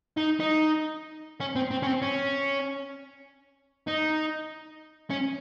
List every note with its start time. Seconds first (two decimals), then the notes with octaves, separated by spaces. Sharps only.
0.17 D#4
0.40 D#4
1.40 C#4
1.56 C4
1.71 C4
1.83 C#4
1.86 C4
2.02 C#4
3.87 D#4
5.10 C#4